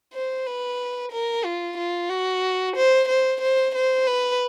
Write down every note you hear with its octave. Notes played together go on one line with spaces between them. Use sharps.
C5
B4
A#4
F4
F4
F#4
C5
C5
C5
C5
B4